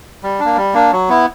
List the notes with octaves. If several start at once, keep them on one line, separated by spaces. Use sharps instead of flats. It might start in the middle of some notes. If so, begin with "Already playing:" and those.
G3
A#3 D4
G3
A#3 D4
F#3
B3 E4